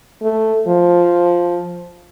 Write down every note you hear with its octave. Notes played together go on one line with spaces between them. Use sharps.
A3
F3